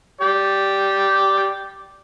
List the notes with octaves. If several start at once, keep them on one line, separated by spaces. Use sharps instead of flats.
G4 D5